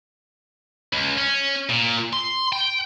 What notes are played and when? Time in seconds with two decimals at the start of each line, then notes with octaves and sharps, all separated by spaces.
0.93 C#2
1.18 C#4
1.69 A#2
2.13 C6
2.52 G5